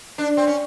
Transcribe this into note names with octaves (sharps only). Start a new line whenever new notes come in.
D4
C4
C#4